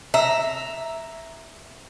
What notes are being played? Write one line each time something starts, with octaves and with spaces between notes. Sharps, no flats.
E5 A#5